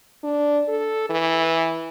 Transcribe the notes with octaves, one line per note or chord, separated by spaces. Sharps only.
D4
A4
E3